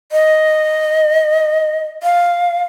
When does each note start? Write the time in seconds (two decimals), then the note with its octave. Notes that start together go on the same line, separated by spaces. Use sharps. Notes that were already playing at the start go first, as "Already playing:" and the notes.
0.12 D#5
2.03 F5